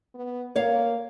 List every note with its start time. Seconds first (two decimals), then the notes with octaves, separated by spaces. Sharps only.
0.14 B3
0.56 A#3 C#5 F5